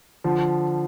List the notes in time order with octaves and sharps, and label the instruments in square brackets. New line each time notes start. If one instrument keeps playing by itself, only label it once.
[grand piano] D3 F3